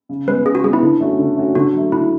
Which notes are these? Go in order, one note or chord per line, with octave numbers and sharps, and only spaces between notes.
C#3
G#3 B3 B4
C#3 G#4
F#4
G#3 B3 G#4
E4
D3
A3 C#4 F#4
D3
A3 C#4 F#4
D3 F#4
F#3 A3
D3 E4